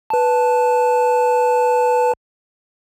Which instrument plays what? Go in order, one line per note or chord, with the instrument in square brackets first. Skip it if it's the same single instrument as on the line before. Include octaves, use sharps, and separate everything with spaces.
[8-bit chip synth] B4 A5